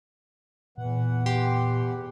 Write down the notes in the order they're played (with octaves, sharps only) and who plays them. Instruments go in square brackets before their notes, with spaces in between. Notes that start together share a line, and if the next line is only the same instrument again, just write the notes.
[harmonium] E2 E3 F#5 [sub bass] A#2
[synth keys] G4 C6